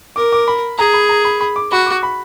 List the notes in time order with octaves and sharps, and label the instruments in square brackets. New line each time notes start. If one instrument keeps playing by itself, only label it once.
[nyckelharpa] A#4 [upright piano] D6
[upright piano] D6
B5
[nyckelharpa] G#4 [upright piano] A#5
[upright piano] B5
A#5
B5
B5
D6
[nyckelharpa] F#4 [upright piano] B5
[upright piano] D6
B5